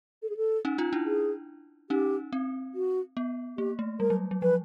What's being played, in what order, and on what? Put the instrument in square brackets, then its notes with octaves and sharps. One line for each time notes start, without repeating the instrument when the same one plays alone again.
[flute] A4
G#4
A4
[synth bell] C#4 D#4
D#4 F4
D4 E4
[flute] G#4
[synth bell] C#4 D#4 [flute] G4
[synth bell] C4
[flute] F#4
[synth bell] B3
[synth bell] A#3 [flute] G4
[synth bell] A3
[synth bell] G3 [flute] A#4
[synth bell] F#3
F#3
[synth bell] F3 [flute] B4